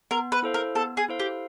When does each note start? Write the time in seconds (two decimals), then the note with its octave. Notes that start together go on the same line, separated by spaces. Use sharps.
0.11 B3 A#4
0.32 B4
0.43 E4 A4 C5 F5
0.54 A#4
0.75 B3 A4
0.97 G#4
1.08 E4 A4 C5 F5
1.19 G4